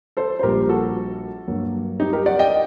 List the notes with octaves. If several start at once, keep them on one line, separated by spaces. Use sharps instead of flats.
A4 C5
C5
A#1 A#2 G3 G4 A#4
F#4 A4
G2 F#3 A#3
D#4 G4
G4 A#4
D5 F#5
D#5 G5